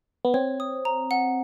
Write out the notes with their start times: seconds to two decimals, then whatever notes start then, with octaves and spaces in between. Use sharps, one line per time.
0.25 B3
0.34 C4 C#5
0.60 D#6
0.85 A#5
1.11 F#5